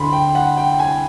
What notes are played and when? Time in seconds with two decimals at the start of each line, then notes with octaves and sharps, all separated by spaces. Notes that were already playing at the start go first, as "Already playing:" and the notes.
Already playing: D2 D3 B5 C6
0.13 G5
0.35 F#5
0.57 G5
0.80 G#5